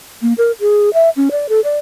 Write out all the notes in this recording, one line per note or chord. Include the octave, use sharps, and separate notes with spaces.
A#3
A#4
G#4
E5
C#4
D5
A4
D5